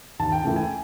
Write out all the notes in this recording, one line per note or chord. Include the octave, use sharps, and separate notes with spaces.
D#2 A5
G5
C#3 E3 A3 G5
G#5